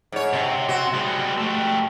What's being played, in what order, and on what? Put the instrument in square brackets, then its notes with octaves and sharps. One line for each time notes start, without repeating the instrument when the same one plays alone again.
[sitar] G#2 C#5
[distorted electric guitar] C3
[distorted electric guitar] C3 C5 [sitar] F#4
[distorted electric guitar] G3 G#3
A3 G4